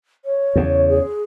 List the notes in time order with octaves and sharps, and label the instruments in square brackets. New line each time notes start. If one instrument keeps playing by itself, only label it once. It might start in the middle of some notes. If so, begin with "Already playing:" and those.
[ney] C#5
[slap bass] E2 C#3
[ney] G#4